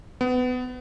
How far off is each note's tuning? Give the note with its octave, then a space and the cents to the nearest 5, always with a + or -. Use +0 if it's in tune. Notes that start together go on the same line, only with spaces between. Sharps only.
B3 +25